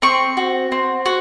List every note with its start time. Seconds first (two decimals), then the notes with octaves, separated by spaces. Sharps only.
0.02 C4 C#6
0.37 F#4
0.72 C4
1.06 F#4